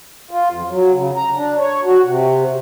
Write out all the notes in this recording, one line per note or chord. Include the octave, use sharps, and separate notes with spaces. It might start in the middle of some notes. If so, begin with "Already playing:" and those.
F4
F2
F#3
C#3
A#5
D4
C#5
F#4
C3